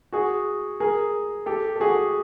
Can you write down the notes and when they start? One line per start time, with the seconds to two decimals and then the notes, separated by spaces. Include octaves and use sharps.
0.12 F#4 G#4
0.80 G#4 A#4
1.46 G4 A4
1.76 A4
1.80 F#4 G#4